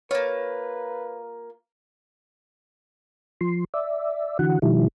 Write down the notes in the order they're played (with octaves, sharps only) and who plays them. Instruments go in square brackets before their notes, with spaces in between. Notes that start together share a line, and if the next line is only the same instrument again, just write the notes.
[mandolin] A#3 F4 [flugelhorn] B4 [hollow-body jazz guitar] C#5
[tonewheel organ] F3 C6
D5 E5
D3 E3 F#4 F#5
B2 D#3 F3 G3 E4